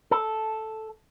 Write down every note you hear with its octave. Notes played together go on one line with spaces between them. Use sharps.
A4